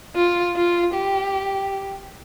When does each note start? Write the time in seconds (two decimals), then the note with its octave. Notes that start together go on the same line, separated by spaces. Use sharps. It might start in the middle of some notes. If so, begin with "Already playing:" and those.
0.16 F4
0.56 F4
0.94 G4